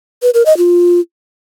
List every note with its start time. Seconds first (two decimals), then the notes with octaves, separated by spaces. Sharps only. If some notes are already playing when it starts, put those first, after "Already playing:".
0.22 B4
0.34 A#4
0.46 D#5
0.57 F4